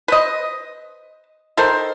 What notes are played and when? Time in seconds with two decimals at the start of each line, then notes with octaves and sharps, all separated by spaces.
0.08 B4 C5 D#5
1.57 D#3 A4 A#4 C5